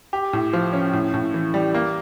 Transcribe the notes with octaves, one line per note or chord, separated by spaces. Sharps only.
G4
A2
F3
C#4
A2
A2
E3
G3
A#3